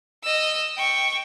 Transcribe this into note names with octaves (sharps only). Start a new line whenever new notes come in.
D#5 E6
G5 C#6